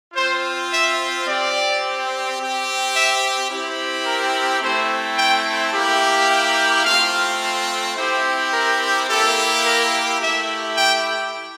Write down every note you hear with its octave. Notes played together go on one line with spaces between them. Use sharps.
C4 F4 C5
E5
C4 G4 D5
C4 G4
E5
C4 E4 G4
A#4
A3 C4 E4 C5
G5
A#3 E4 G4
G5
A3 C4 F4 F5
C4 E4 G4 C5
A#4
A#3 E4 G4 A4
A#4
A3 E4 G4 E5
G5